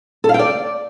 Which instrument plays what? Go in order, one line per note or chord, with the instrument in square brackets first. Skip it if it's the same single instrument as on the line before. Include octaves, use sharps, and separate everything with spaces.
[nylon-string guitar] A4
F5
G5
D5